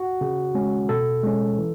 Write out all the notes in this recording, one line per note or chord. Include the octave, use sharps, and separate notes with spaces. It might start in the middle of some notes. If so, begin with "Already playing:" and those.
Already playing: F#4
C#3
G#3 C#4
B2 A4
G#3 C#4
E3